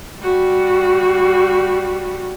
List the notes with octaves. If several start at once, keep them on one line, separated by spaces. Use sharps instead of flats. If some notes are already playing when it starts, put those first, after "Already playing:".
G3 F#4